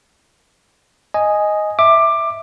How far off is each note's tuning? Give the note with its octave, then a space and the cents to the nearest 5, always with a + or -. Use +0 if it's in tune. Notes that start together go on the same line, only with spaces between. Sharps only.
D#5 +0 G#5 +0
E5 +0 D6 +15